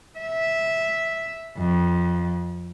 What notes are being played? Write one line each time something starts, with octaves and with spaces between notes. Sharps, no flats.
E5
F2